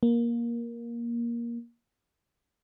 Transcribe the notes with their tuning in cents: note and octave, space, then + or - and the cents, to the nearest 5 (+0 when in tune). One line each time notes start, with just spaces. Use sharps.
A#3 +15